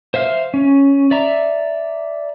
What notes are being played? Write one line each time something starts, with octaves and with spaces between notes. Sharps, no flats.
C5 E5 F5 F6
C#4
D5 E5 A#5